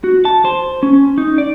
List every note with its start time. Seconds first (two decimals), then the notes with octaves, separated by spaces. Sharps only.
0.04 F#4
0.25 A5
0.45 C5
0.83 C#4
1.18 D#4
1.38 D5